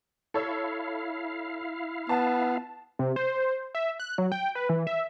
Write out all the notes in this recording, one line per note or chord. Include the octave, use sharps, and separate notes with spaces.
E4 A4 C#5 F5 E6
B3 A5
C3
C5
E5
F#6
F#3
G5
B4
E3
E5